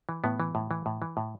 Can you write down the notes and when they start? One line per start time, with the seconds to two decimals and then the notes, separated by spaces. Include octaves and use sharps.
0.09 E3
0.24 A2 B3
0.40 E3
0.55 A2
0.71 E3
0.86 A2
1.02 E3
1.17 A2